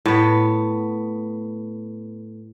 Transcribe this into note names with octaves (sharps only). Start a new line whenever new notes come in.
A2 B3